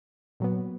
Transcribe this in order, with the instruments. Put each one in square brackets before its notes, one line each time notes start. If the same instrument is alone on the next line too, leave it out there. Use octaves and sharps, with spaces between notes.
[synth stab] A#2 F#3 B3